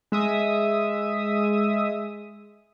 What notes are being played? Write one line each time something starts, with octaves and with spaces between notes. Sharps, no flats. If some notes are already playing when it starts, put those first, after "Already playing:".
G#3 E5 D#6